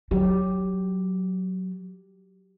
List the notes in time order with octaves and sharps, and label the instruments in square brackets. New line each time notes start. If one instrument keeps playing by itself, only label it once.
[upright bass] F#3 [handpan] F#4 G4